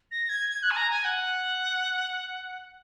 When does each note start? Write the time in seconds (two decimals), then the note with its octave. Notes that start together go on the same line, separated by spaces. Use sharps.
0.11 A#6
0.29 G#6
0.49 G#6
0.63 F#6
0.71 G#5
0.76 A#5
0.91 G#5
1.05 F#5